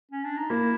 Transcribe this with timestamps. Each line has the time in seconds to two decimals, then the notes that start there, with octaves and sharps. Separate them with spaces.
0.11 C#4
0.24 D4
0.38 D#4
0.50 A#3 E4